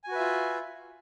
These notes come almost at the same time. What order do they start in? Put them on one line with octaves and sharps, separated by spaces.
G#5 F#4 B4 E5 F4